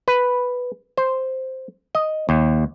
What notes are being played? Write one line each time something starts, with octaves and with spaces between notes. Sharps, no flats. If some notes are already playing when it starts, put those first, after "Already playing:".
B4
C5
D#5
D#2